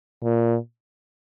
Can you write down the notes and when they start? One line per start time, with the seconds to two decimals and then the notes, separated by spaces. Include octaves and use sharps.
0.23 A#2